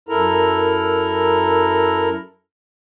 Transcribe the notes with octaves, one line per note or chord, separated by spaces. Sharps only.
F#2 E4 A4 A#4 A#5